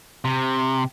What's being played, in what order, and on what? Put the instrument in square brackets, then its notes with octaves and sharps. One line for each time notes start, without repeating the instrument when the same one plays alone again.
[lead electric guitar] C3